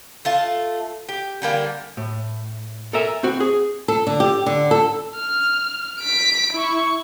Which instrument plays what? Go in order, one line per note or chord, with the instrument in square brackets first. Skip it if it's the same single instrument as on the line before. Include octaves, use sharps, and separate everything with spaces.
[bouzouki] A3 F4 A5
G4
D3 G3 A#3 G#5
[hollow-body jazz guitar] A2
A4 A#4 E5 G#5
C4 F#4
G#4
[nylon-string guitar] A4
D3
G4
D3
A4
[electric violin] F6
B6 D7
E4 C#6